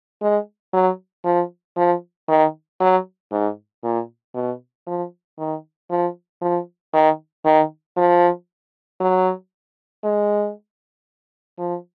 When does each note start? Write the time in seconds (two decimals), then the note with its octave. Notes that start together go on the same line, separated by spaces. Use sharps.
0.22 G#3
0.73 F#3
1.25 F3
1.77 F3
2.28 D#3
2.80 F#3
3.32 G#2
3.83 A#2
4.35 B2
4.87 F3
5.38 D#3
5.90 F3
6.42 F3
6.93 D#3
7.45 D#3
7.97 F3
9.00 F#3
10.03 G#3
11.59 F3